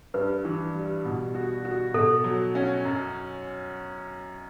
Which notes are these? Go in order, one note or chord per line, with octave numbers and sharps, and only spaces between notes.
G2 B4
E3
G3
B2
F#4
F#4
B2 A4
F#3
C#4
F#2